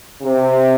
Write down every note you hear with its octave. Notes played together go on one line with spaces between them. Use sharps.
C3